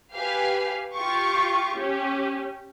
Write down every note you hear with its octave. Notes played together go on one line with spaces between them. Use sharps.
G4 B4 F5 G#5
F4 G4 C#6 D6
C#4 G4